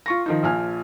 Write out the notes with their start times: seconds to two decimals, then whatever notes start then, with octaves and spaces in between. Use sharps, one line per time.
0.06 F4 C#6 A#6
0.26 D#3 F3 D#4
0.43 A#1 F3 G#5 F6